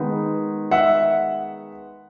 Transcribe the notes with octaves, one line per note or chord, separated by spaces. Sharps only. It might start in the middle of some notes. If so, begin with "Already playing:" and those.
Already playing: D#3 G#3 B3 D#4
E5 F#5